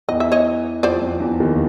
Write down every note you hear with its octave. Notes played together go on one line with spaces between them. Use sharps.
E2 E3 D#5
E5
C#5 D#5
F2 F3 C5 D5
F2 F3
E2 E3
D#2 D#3